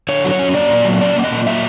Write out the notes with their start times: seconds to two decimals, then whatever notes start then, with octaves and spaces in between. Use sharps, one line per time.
0.09 D3 C#5
0.24 F#3
0.32 C#5
0.39 C#4
0.54 A#3 D5
0.70 A#2
0.85 F#3
1.01 C#4 D5
1.16 A#3
1.24 D#5
1.32 A#2
1.46 F#3 E5